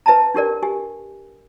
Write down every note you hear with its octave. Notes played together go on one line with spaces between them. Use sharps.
B4 E5 A5 A#5
D4 G4 A#4 D5
G4 G#5